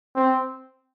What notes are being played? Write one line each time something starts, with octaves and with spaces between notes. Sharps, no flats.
C4